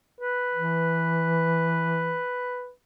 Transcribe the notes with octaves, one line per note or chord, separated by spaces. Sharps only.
B4
E3